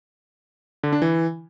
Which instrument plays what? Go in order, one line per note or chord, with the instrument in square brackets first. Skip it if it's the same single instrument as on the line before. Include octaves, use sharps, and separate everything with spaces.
[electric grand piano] D3
D4
E3